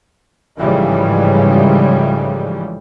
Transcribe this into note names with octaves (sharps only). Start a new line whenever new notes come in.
A1 G#2 C#3 E3 F3 G3